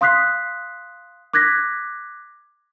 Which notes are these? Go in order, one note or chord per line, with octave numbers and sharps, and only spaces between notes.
F5 C6 D#6 F#6 B6 C7
D6 F#6 G#6 A#6 B6